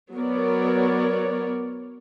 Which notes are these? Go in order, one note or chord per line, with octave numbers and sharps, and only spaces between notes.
F#3 B3 A#4 C#5 D5